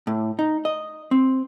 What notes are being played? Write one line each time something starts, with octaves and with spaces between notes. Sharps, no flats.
A2
D#4
D#5
C4